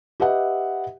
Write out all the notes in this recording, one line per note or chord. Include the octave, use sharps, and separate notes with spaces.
G4 B4 D#5 E5 F#5